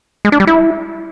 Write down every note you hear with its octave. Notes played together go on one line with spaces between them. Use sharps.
G#3
D4
G3
E4